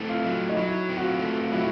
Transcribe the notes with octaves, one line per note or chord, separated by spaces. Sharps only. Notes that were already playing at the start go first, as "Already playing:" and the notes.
Already playing: A3 C4 E4
F4
F#3
D#4
F#3 E4
C4
F#4
F4
A3
F4
F#3 E4